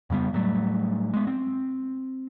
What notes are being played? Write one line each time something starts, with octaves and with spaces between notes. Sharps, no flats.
F2 C#3 G3 B3
A2 F#3 G3 A3
G#3 B3
C4